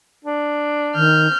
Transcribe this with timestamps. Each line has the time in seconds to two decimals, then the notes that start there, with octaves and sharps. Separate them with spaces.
0.25 D4
0.95 D#3 F6 G6